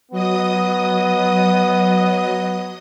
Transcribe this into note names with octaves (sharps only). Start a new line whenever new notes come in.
F#3 B3 D#5 D#6